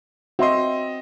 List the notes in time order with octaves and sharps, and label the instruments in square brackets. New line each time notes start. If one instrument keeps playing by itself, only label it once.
[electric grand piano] C4 D#5 [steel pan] F#4 E5 C6